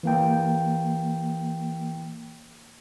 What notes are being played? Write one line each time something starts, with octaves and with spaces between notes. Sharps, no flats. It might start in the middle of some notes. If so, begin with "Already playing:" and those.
E3 A#3 G5